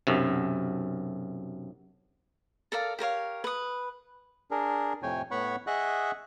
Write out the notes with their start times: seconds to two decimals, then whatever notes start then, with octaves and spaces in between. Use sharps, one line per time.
0.07 B1 F#2 C3
2.72 A4 A#4 D5 F5
2.99 G4 A#4 C#5 F5
3.44 B4 D#6
4.51 D4 G#4 A#4
5.03 F2 A2 C3 C#5 G5 G#5
5.31 A2 B3 C#5 F#5 B5 C#6
5.67 G#4 D#5 E5 F#5 C#6 F#6